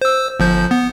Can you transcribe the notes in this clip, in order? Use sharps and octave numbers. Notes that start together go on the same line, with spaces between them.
C5 E6
G1 F3 G6
B3